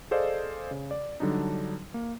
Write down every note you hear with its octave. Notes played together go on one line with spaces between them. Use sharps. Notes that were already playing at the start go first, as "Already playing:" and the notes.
G#4 A4 C5 D5 D#5 F5
C#3
D5
D3 F#3 G3 D4 D#4
A#3